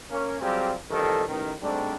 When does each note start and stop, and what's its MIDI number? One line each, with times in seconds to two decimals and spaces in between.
0.10 0.39 58
0.10 0.39 61
0.41 0.72 54
0.41 0.72 55
0.41 0.72 60
0.41 0.72 65
0.41 0.72 67
0.41 0.72 68
0.91 1.23 33
0.91 1.23 41
0.91 1.23 51
0.91 1.23 55
0.91 1.23 69
1.27 1.52 33
1.27 1.52 51
1.62 1.95 44
1.62 1.95 55
1.62 1.95 57
1.62 1.95 60
1.62 1.95 62